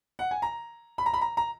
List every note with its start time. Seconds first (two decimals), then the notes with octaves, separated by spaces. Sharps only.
0.19 F#5
0.31 G#5
0.42 A#5
0.98 B5
1.06 A#5
1.14 B5
1.21 A#5
1.37 A#5